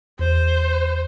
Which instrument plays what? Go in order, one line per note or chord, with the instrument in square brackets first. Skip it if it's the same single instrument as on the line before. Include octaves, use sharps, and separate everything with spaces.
[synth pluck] E2 [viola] C5